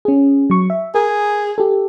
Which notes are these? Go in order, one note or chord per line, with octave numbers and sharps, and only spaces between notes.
C#4 G#4
F#3 C#6
E5
G#4 A#4
G4 A4